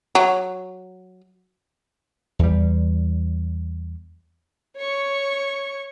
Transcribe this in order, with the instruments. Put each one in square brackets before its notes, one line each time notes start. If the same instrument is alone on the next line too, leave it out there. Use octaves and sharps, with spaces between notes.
[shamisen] F#3
[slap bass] E2 G3
[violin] C#5 C#6